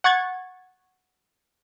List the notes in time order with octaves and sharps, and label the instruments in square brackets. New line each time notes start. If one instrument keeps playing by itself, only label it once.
[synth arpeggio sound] F#5 C#6 G#6 A6